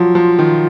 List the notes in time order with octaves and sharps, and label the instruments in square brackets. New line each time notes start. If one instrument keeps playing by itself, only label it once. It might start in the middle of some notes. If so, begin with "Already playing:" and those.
Already playing: [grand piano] F3 F#3 [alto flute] F4
[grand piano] F3
D#3